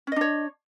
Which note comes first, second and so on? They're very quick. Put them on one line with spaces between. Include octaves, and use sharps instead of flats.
C#4 D#5 D4 C#5